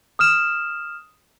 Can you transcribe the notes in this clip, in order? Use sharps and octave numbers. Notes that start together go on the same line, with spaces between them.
D#6 F6 E7